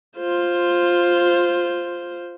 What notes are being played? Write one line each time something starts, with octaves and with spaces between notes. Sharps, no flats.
F4 C5